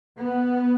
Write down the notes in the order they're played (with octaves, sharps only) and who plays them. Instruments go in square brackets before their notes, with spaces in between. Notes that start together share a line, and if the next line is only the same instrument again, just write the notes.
[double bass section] B3